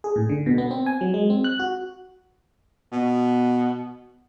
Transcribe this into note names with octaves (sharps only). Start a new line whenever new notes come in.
G#4
A2
D3
B2
B3
C4
G#5
F#3
G#3
C4
F#6
F#4
B2